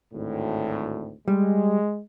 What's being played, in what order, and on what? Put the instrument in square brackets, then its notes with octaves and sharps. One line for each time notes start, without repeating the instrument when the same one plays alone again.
[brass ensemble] G#1 D2 A2
[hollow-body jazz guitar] G3 [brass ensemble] G#3